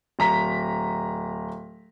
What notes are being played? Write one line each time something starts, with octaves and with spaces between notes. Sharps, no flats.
D1 A#5 B6